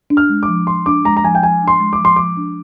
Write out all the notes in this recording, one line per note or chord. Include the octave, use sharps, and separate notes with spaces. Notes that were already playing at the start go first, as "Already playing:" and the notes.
D4
F6
G#3
D6
F3
F3 C6
D4 D6
G#3 A#5
A#5
F3 G#5
G5
F3 G#5
D4
C6
G#3
D6
F3 C6
F3 D6
D4